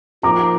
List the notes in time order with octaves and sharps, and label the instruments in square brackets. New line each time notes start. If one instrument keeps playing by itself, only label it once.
[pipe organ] F3 A#3 D#4 [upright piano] A#5 D6